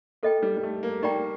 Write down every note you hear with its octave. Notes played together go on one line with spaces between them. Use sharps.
A#3 A4 D#5 G5
G3
G3
A3
A#3
A#3 D#4 G4 D5 G5 A#5